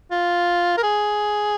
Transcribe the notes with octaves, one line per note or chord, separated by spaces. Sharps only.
F4
A#4
G#4